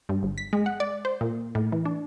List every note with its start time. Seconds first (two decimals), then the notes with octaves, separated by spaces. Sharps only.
0.09 G2
0.23 G1
0.38 B6
0.53 G#3
0.66 F#5
0.80 D5
1.05 C5
1.21 A#2
1.55 A2
1.72 E3
1.85 D4